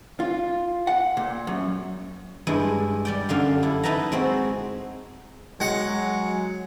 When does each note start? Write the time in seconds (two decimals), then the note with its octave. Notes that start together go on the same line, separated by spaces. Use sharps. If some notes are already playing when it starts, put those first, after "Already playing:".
0.20 F4
0.87 F#5
1.17 A#2
1.47 F#2
2.47 G2 G#3 E4
3.05 G3 D5 G5
3.29 F#2 D3 F5 C6
3.63 E4 A4
3.83 D#4 E4 B4 A5 A#5
4.12 G#3 C4 F#4
5.60 F#3 G#3 F#5